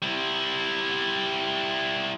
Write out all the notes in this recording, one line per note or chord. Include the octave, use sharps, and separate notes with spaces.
G3 E4